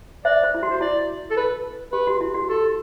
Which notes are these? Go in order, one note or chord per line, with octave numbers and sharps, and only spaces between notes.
C5 D5 E5
C5
E4
F#4
C5
E4 D5
A4
B4
G4 B4
F#4
E4
F#4
G4 A4